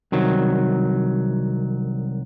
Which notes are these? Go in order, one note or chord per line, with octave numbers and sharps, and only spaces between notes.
C2 D#3 F#3